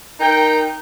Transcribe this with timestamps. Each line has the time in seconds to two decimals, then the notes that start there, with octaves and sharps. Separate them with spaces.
0.20 D#4 A#4 G5